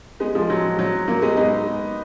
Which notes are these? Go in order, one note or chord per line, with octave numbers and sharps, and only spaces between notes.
G#3 B3
F3 G#3
F#3
F#3
F#3 A#3
G#3 B3
B3 D#4